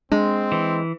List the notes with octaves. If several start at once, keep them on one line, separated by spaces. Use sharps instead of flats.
G#3 C4 D4
E3